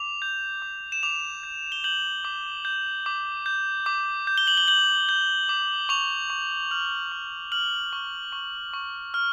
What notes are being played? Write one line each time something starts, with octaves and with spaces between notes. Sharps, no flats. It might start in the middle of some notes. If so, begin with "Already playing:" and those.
Already playing: D6 F7
G6
D6
E7
D6 F7
G6
G7
G6 F#7
D6
G6
D6
G6
D6
G6
G7
F#7
G7
G6 F#7
G6
D6
C#6 F7
C#6
F6 F#7
C#6
F6 F#7
C#6
C#6
C#6
F6